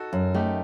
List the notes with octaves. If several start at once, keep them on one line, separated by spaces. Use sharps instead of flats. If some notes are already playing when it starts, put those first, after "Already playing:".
Already playing: D#4 F#4 A4
F#2
A3 D#4 G4